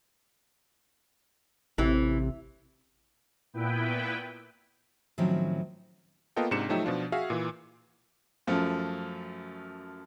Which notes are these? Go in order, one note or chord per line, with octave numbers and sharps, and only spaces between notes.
A1 C3 E3
A#2 B3 E4 B4 G5
A2 D#3 F3 F#3 C4 C#4
A#3 B3 F4 A4 D#5 G5
G#2 C3 D4 C#7 E7
F3 F#3 A3 D#4 G4 E5
B2 F3 D4 F4
F#4 G#4 E5 F5
A#2 E3
F#2 F3 A3